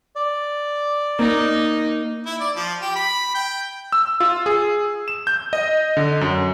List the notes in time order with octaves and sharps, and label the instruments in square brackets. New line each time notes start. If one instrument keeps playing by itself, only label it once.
[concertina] D5
[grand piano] A#3 [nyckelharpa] D#4
[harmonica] E4
D5
F3
G4
B5
G5
[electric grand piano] E6
F4
G#4
E7
G6
D#5
D3
F#2